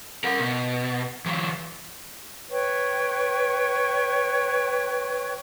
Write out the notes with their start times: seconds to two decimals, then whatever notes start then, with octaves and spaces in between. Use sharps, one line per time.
0.24 A#4 F#5
0.39 B2
1.26 E3 F#3
2.50 B4 C#5 G5 C#6